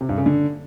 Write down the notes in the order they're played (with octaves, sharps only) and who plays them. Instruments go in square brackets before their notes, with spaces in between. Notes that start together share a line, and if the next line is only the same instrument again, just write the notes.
[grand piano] C3
G2
C#3
D3